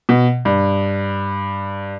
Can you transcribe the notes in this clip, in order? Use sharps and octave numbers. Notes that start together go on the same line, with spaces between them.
B2
G2